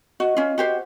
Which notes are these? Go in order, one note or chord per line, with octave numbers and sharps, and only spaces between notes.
F#4 D#5
C#4 F4
F#4 G4 C5